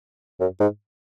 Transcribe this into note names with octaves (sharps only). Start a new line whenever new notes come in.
F#2
G#2